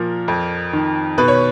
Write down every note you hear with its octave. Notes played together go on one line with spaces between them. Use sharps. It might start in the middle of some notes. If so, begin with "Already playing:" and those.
Already playing: A#2 F3 A#4
F2
D#3
B2 B4
C#5